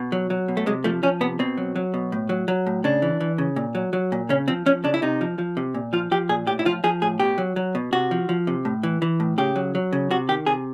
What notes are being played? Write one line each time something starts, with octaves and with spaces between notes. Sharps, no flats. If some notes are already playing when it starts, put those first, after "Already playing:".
Already playing: B2
F#3
F#3
B2
A3
C3 G#3
F3 A3
F3 C#4
C3 B3
B2 C4
F#3
F#3
B2
A2
F#3
F#3
A2
C#3 D4
E3
E3
C#3
A#2
F#3
F#3
A#2
C#3 C#4
F3 C4
F3 C#4
C#3 D4
E4
C3 D#4
F3
F3
C3
A#2
F3 F4
F3 G4
A#2 G#4
A2 G4
E4
F3 F4
F3 G#4
A2 G#4
B2 G4
F#3
F#3
B2
C3 F#4
F3
F3
C3
A2
E3
E3
A2
C#3 G4
F#3
F#3
C#3
C3 F#4
D#3 G4
C3 G#4